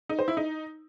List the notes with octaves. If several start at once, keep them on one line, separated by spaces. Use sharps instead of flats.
D#4
C5
E4
D#4